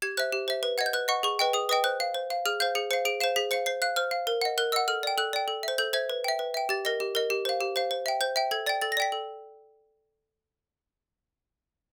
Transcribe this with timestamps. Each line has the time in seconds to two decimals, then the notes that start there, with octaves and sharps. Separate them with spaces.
0.02 G4 G#6
0.17 C5 E5 F#6
0.32 G4
0.48 C5 E5
0.63 B4
0.78 D#5 F#5 G#6
0.86 G6
0.93 B4 F#6
1.08 D#5 F#5 C#6
1.23 G#4 C#6
1.39 B4 D#5 G5
1.53 G#4 D#6
1.69 B4 D#5 G5 D#6
1.84 C5 F#6
2.00 F5
2.14 C5
2.30 F5
2.46 G#4 F6
2.60 C5 F5 G6
2.75 G#4 C#7
2.91 C5 F5 C#7
3.05 G#4 D7
3.20 C5 F5 E7
3.36 G#4 B6
3.51 C5 F5 C#7
3.66 C5 C7
3.82 F5 F#6
3.96 C5 F6
4.11 F5
4.27 A#4
4.42 D#5 F#5
4.58 A#4 F#6
4.72 D#5 F#5 E6
4.88 A4 F6
5.03 D5 G5
5.18 A4 F#6
5.33 D5 G5
5.48 A4
5.63 C5 E5
5.78 A4 G6
5.93 C5 E5 G#6
6.10 B4
6.24 E5 G5
6.39 B4
6.54 E5 G5
6.69 G4 A6
6.85 A#4 D#5 A#6
7.00 G4
7.15 A#4 D#5
7.30 G4
7.45 C5 F5
7.61 G4
7.76 C5 F5
7.91 C5
8.06 E5 G5
8.21 C5 G6
8.36 E5 G5
8.51 A4 G#6
8.66 D5 G5 A6
8.82 A4 A6
8.92 A#6
8.97 D5 G5 B6
9.12 A4